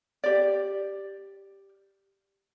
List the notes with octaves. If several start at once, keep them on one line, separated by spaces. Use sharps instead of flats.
G4 D5